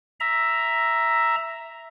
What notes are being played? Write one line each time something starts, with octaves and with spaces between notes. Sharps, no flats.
E5 A#5